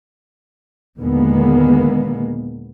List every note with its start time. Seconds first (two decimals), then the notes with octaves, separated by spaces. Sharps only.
0.99 D#2 A#2 D3 G#3 A#3 B3